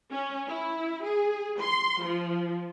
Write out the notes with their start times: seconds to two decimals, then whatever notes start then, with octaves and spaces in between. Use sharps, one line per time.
0.11 C#4
0.49 E4
1.06 G#4
1.62 C6
2.04 F3